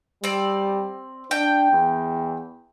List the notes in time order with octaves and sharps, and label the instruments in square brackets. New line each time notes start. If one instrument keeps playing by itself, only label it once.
[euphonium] G3 [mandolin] C4 D5
[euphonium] D4 [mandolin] G5
[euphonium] E2